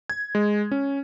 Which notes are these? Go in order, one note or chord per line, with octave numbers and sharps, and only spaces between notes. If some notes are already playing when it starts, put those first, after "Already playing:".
G#6
G#3
C#4